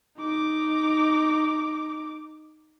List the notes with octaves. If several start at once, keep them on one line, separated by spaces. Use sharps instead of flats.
D#4 D6